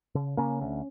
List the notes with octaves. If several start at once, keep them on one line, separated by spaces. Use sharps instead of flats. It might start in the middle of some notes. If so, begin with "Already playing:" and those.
C#3
C#3 A#3 C#4
D2